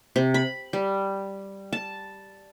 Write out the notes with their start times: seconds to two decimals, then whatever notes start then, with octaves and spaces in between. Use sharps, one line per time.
0.16 C3
0.34 B5
0.73 G3
1.73 A5